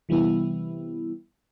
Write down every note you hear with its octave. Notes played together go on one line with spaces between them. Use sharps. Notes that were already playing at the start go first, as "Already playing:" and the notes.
C3 E3 G3 B3 E4